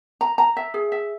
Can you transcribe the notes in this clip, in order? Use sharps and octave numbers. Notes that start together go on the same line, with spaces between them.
A#5
A#5
E5
G#4
E5